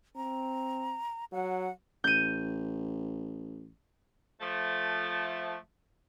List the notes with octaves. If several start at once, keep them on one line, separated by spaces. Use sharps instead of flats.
C4 A#5
F#3 F#5
A1 G6 D#7
F3 A3